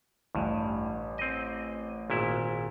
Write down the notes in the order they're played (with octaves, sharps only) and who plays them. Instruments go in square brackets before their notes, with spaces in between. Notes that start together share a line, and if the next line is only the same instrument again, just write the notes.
[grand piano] A1 [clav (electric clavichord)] G2
[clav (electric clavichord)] C4 D#5
G#1 A#2 E4